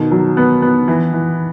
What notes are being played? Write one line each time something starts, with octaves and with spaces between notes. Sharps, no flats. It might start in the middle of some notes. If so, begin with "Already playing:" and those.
Already playing: B2 D#3
F#3
B3
B3
E3
E3